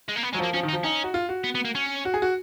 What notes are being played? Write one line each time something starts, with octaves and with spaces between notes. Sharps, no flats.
G#3
A#3
B3
F#3 G#3
F3 A#3
F3 C#4
D#3
D#4
F3
C#4 D#4
F#4
F4
F#4
B3
B3
A#3
C#4
F#4
G#4
F#4